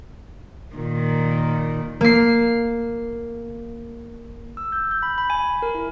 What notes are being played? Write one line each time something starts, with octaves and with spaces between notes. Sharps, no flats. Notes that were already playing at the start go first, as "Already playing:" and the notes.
A#2 D#3
A#3 C7
E6
G6
G6
B5
B5
G#5
A#4
E4